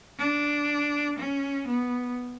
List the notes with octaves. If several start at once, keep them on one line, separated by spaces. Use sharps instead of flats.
D4
C#4
B3